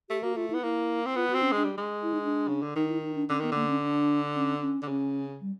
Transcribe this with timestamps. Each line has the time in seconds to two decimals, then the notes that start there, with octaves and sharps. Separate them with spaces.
0.09 A3 G4
0.23 A#3 F#4
0.36 A3 F4
0.50 E4
0.54 B3
0.63 A#3 E4
1.06 C4
1.16 B3 F4
1.30 C4 F#4
1.43 C#4
1.52 G#3 D4
1.64 G3
1.77 G#3
2.03 E4
2.13 D#4
2.23 D4
2.48 C#3
2.62 D3
2.76 D#3 D#4
2.89 E4
3.02 D#4
3.15 D4
3.29 D3 C#4
3.40 D#3 B3
3.52 D3 A#3
3.68 C#4
3.83 D4
4.36 C#4
4.62 C#4
4.82 D3
4.88 C#3 C#4
5.41 G3